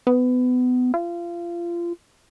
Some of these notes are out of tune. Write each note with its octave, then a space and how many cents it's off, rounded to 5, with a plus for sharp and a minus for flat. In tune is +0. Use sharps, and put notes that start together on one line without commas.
B3 +25
F4 -25